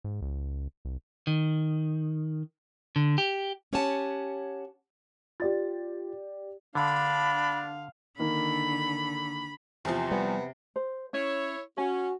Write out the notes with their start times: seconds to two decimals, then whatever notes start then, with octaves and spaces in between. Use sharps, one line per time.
0.04 G#2
0.22 C#2
0.85 C2
1.27 D#3
2.96 D3
3.18 G4
3.73 C#4 G4 C#5 F#5 G#5 A5
5.40 F4 G4 D5 A6
6.75 D3 D4 F5 B5
8.20 D3 D#3 A#3 B5
9.85 E2 C3 F3 C5
10.11 G3 B3
10.76 C5
11.13 C#4 E4 C#5
11.78 C#4 F#4 G#5